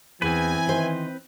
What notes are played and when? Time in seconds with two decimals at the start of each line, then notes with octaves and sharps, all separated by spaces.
0.22 E2 E3 C4 B4 G#5
0.67 D#3 C5